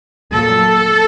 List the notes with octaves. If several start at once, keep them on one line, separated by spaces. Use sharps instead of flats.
A#2 F#3 A#3 A4